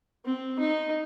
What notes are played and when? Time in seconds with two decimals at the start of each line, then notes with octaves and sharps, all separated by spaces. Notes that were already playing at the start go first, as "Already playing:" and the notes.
0.25 C4
0.59 D#4